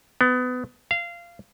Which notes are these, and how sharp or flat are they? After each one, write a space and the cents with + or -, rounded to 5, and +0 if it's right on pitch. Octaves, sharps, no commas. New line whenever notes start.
B3 +25
F5 -20